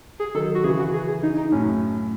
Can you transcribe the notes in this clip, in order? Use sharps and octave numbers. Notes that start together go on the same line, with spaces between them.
G#4
D#3 F#3 A4
F#4
C#3 E3 G#4
F#4
G#4
G#4
D#4
D#4
F#2 A2 C#4